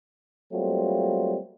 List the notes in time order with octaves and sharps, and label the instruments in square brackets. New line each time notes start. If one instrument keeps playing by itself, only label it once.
[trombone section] F#3 G3 A3 A#3 C4 F4